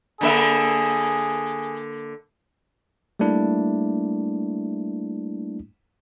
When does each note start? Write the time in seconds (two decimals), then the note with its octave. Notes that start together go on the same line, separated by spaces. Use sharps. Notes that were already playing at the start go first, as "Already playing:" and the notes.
0.21 D3 A#3 G#4 E5
3.20 G3 A3 A#3 D4 E4